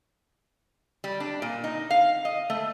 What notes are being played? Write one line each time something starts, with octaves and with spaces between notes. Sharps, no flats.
G3
D4
A#2
D#4
F5
D#5
A3